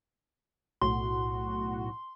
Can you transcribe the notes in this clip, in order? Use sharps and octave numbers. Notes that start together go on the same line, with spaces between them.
B1 A2 F#4 C6